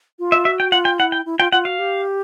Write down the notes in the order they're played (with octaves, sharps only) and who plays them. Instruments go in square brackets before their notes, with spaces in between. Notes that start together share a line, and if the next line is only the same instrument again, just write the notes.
[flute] F4
[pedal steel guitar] E5
[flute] F#4 [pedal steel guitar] E5
[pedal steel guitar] G5
[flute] F4 [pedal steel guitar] F#5
[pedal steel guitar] G5
[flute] E4 [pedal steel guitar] F#5
[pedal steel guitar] G5
[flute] E4
[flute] F4 [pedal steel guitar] G5
[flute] F4 [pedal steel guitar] F#5
[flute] F#4 [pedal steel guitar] F5
[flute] G4